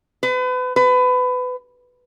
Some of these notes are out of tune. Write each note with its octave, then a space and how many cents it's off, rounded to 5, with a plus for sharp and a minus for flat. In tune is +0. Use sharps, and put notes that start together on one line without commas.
B4 +35
B4 +25